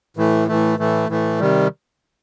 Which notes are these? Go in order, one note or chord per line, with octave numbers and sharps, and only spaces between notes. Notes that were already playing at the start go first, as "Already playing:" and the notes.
A2 E3 A3
A2 E3 A3
A2 E3 A3
A2 E3 A3
C3 D#3 G3